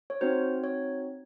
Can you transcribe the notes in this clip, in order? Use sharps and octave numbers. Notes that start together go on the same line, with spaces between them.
C#5
C4 D#4 F#4 C5
C#5